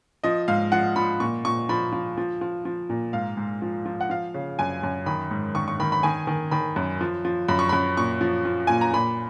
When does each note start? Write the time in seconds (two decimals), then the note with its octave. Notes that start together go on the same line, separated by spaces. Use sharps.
0.24 F3 D#5
0.48 G#2 F5
0.72 F3 F#5
0.96 F3 B5
1.20 A#2 C#6
1.45 A#2 C#6
1.69 F3 B5
1.93 F3
2.18 F3
2.41 F3
2.65 F3
2.90 A#2
3.13 G#2 F5
3.37 G#2
3.62 F3
3.86 F3
4.01 F#5
4.10 F3 F5
4.34 C#3
4.59 F#2 G#5
4.83 F#2
5.06 D#3 B5
5.31 G#2
5.55 D#3 C#6
5.68 C#6
5.80 D#3 B5
5.92 B5
6.03 D#3 G#5
6.27 D#3
6.51 D#3 B5
6.76 F#2
7.01 F3
7.25 F3
7.48 F#2 B5
7.59 C#6
7.69 F#2 B5
7.97 A#2 C#6
8.21 F3
8.45 F3
8.67 A#2 G#5
8.81 A#5
8.93 A#2 B5